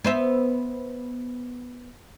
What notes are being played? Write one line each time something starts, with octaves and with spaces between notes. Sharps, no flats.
B3 C5 E5